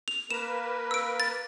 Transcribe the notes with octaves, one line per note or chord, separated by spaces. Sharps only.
F7
A#3 A#4 B4 E7
E6 D7
A6